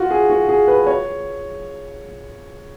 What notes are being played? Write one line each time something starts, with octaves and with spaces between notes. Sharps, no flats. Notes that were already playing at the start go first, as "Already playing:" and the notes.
Already playing: F4 F#4
G#4
F#4
G#4
B4
C#5